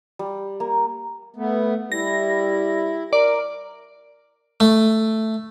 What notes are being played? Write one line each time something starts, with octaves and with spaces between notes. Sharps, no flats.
G3
A#3
A3 B3
G3 E4 A#6
A#4 D5
A3